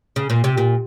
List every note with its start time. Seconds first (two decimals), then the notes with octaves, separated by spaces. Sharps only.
0.16 C#3
0.30 A#2
0.44 C3
0.58 A#2